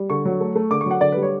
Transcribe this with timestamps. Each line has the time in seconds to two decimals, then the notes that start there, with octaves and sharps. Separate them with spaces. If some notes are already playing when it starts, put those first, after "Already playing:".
Already playing: G3
0.10 D3 C#6
0.25 F#3
0.40 A3
0.55 A3
0.71 D3 D6
0.81 C#6
0.86 F#3 F#5
1.01 D3 D5
1.12 G3 B4
1.22 C#5